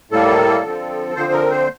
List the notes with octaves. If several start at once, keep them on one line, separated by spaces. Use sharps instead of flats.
A2 G3 A#3 A4
D3 F3 C4
D3 F3 C4 C5
A#4
C5